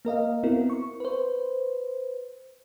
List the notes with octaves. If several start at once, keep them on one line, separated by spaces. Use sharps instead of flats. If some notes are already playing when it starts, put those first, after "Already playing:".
A#3 A#4 D#5 F5
B3 C4 E4 F#4 A#4
C#6
B4 C5